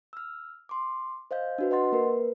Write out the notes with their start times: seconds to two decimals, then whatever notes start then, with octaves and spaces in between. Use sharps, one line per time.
0.13 E6 F6
0.69 C6 D6
1.31 C5 D#5 F5 G6
1.58 D4 F#4 B4
1.71 B4 D#5 F#5 C6 A6
1.92 A#3 A#4 B4